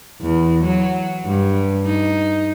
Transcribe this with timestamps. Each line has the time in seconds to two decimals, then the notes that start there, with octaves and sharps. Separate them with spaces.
0.22 E2
0.64 F#3
1.26 G2
1.86 D#4